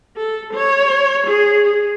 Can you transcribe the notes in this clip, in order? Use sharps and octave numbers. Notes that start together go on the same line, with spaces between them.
A4
C#5
G#4